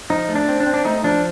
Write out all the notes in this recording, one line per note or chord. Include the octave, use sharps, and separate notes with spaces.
F3 D#4
A3
D4
C4
D4
C4
D4
A3 D#4
F3 D4